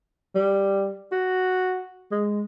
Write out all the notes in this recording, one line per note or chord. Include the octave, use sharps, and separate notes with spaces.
G3
F#4
G#3